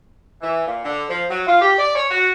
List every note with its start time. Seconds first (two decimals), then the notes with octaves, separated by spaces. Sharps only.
0.42 E3
0.67 A#2
0.83 D3
1.09 F3
1.30 F#3
1.47 F4
1.60 G4
1.77 D5
1.96 C#5
2.10 F#4